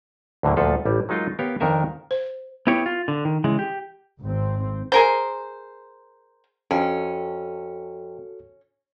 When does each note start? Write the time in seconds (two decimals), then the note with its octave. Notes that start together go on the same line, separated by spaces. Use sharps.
0.43 D2 A2 D3 F#3 A#3
0.57 D2 A#2 F3 A4 B4 F5
0.85 A1 G3
1.09 F#3 G#3 D#4 F4 A#4 D#5
1.39 B3 G4 A#4 C#5 F5
1.60 F2 D#3 D4 A#4 E5 G#5
2.11 C5
2.67 B3 E4 G4 C#5
2.86 F4
3.08 D3
3.25 D#3
3.44 C#3 E3 G#3
3.59 G4
4.21 G#1 C4
4.92 G#4 A#4 C5
6.71 F2 C#4 F#4 A4